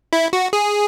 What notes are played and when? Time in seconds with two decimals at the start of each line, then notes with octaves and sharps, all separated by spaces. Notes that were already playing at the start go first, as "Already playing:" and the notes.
0.13 E4
0.33 F#4
0.53 G#4